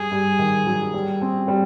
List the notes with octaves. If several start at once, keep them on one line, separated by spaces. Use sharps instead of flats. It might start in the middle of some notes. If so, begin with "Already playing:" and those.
Already playing: G2 G#4
G2
D#3
F#3
G3
C4
G3